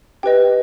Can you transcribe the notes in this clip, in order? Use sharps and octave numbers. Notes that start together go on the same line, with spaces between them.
G4 B4 D#5 G5